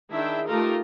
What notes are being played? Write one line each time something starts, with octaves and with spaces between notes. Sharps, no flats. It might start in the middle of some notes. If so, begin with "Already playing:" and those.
D#3 D4 E4 G#4 E5 G5
A3 D#4 F4 G4 A4 A#4